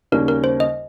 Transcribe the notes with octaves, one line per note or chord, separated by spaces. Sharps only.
D#2 C#3 G3 A#3 C#4 A#4
A#4
C5
D#5